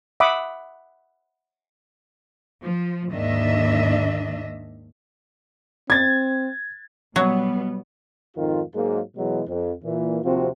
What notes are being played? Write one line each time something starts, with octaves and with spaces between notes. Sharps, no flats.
E5 F#5 B5 D6 D#6
F3
D#2 G#2 D#3 D4 D#5 E5
C4 G#6 A6
B2 F#3 G3 B3
F2 G#2 D#3 F4
G#2 F#3 G#3 A#3
B2 E3 F#3 G#3
F2
A#2 E3
D#2 C3 F3 C4 F4 F#4